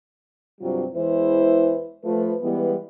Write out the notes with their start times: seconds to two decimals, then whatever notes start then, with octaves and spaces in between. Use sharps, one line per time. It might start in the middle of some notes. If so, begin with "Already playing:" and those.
0.61 G2 C3 F#3 G3 C4 F4
0.94 E2 E3 G#3 E4 B4 C5
2.05 F3 A3 B4
2.42 E3 G3 G#3 B3